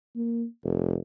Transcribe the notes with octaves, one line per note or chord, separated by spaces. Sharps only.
A#3
F1